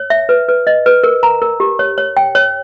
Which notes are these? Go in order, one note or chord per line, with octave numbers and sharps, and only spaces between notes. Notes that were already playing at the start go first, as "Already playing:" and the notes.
Already playing: C#5
E5
B4
B4
D#5
B4
A#4
A#5
A#4
G4
C#5
C#5
G5
C#5